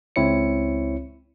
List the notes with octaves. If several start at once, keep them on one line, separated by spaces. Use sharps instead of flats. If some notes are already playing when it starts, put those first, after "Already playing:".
C#2 C4 E4 C#5 C#7